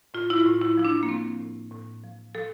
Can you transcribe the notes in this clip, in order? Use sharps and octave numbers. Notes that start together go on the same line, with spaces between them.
A2 F4
E4
F4
A2
E4
F3 E4
D4
A#3
F3 C4
A2
A2
F3
F3 A4